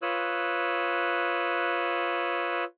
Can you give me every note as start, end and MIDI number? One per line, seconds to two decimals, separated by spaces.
0.02 2.64 65
0.02 2.64 71
0.02 2.64 73
0.02 2.64 87
0.02 2.64 88
0.02 2.64 90